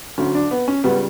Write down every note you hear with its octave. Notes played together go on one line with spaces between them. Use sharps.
D2 D3 F#3 C#4
D4
B3
C#4
C#2 C#3 G3 B3